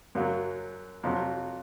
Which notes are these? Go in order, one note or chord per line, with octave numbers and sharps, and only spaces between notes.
F#2 C#3 F#3
F2 C3 F#3